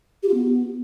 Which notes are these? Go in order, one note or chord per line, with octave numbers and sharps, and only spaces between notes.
G4
F4
B3